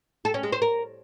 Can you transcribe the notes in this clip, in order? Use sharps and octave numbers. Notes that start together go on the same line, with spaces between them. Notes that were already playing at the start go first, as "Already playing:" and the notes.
A4
C#4
G#3
C5
A#4